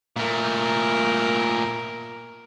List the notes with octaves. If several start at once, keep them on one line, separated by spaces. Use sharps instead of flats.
A#2 A3 A#4